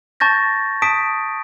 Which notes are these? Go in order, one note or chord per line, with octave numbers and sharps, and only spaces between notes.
A5 C#6 G6 A6 A#6
A5 D#6 B6 D7